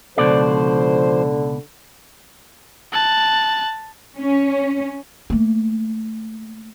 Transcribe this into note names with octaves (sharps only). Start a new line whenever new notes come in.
C#2 B2 D3 F3 C5 D5
A5 F#6
C#4
A3 A#3